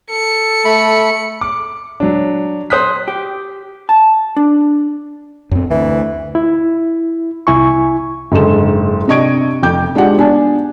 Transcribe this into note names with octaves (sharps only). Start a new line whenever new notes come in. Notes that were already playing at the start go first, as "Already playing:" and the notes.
A4 C#7
A3 B5
D6
F#3 D4
C5 D#6 F#6 B6
G4
A5
D4
F#2 C4
D2 E3
E4
C2 E4 G#5 C#6
F#1 G#2 D3 A4 E7
C3 D4 D#5 C#6 G#6 D7
F1 F2 G5 D6 G6
G#3 D4 F4 G4 F#5
B3 D4 G#5 A5